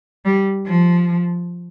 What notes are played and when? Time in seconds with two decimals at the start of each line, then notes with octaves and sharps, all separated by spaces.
0.25 G3
0.66 F3